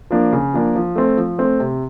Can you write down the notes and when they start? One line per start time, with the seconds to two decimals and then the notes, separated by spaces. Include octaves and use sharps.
0.11 F3 A#3 D4
0.32 C#3
0.54 F3 A#3 D4
0.75 F3
0.95 A3 C4
1.17 F3
1.38 A3 C4
1.60 C3